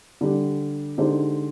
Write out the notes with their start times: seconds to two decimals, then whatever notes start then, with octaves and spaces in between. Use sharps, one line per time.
0.21 D3 G3 D4 G4
0.98 D3 G#3 D#4 G4 C5